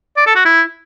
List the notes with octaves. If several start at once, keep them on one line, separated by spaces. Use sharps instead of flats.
D5
A4
F#4
E4